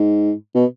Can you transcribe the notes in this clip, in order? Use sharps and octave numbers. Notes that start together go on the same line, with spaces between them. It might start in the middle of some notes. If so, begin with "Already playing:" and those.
Already playing: G#2
B2